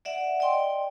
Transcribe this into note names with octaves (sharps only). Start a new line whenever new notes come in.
D5 E5 F#5
D5 D#5 G5 C6